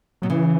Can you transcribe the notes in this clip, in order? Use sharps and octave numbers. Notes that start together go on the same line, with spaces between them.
B2 F#3
C#3 E3